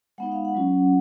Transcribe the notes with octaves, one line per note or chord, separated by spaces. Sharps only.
G#3 B3 D#4 F#5
F5
F#5
F#3 C#4 F4